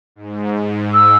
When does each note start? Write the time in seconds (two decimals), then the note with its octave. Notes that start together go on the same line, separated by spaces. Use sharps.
0.16 G#2
0.55 G#2
0.94 E6